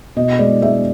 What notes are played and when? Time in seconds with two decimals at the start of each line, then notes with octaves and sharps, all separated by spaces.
0.16 B2 D#5
0.39 G#3 D5
0.62 G#3 E5